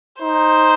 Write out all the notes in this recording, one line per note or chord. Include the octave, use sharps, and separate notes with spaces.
D#4 C5